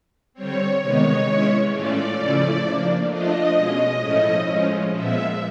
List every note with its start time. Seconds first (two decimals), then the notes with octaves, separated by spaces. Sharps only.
0.34 D3 G3 C4 C#5
0.79 C3 D#3 G#3 B3 D#4 C#5
1.25 E3 G#3 C#4 E4
1.71 A2 E3 A3 C#4 F4 D5
2.17 C#3 F3 A3 C#4 E4
2.63 F3 A#3 D4
3.08 F3 A3 D4 F4 D#5
3.54 B2 G#3 C#4
4.01 A2 F3 A3 C#4 E4
4.46 F3 G#3 C#4
4.92 A#2 F3 G#3 B3 E5